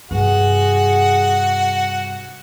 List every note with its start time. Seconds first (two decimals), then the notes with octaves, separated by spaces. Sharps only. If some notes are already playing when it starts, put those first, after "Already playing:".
0.11 G2 C3 F#4 G#4 F#5